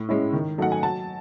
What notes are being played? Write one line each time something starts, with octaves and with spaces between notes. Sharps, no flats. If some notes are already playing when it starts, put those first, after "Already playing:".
Already playing: A2
G#3 C#4 E4
D#3
F#3 A3 D#4 F#5
G#5
F#3 A5